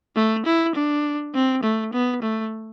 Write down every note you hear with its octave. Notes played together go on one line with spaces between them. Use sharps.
A3
E4
D4
C4
A3
B3
A3